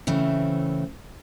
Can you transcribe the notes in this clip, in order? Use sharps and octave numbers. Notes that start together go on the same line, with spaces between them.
C#3 E3 A3 C4